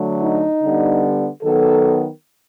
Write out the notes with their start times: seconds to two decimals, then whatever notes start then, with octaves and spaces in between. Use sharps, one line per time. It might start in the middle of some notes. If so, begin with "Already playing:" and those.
Already playing: D3 F#3 A3
0.21 D#4
0.61 D3 G3 B3
1.42 D#3 F#3 B3 A4